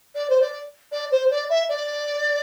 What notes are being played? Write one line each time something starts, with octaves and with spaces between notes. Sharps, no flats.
D5
C5
D5
D5
C5
D5
E5
D5